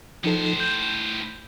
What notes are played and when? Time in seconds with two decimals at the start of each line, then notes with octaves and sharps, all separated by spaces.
0.24 A2 F3 D#4 A4 C5
0.60 G6